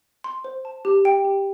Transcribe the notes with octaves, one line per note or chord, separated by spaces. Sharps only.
C6
C5
A5
G4
G5
G4